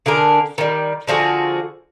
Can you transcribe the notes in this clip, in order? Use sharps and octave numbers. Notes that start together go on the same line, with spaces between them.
D3 D4 G#4 A#4
D#3 G3
D3 F3 F#4 G#4